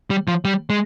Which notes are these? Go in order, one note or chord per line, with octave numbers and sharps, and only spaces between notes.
G3
F3
G3
G#3